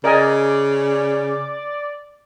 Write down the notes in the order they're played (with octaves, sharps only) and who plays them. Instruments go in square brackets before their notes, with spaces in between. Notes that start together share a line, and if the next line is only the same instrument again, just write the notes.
[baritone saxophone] C#3 [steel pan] A#4 D#5 G#5 [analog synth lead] D5